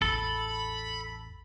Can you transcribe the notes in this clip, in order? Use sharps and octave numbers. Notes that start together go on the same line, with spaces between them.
A1 E2 A4 B5